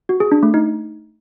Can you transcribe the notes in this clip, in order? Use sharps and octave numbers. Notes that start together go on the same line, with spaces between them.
F#4
G#4
D4
A3
D#4